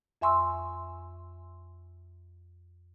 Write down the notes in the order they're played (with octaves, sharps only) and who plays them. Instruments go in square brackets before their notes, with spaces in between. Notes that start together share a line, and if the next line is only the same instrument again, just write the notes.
[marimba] F2 E5 G#5 C6 C#6 E6